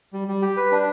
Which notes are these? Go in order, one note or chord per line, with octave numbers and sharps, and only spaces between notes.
G3
G3
G4
B4
D4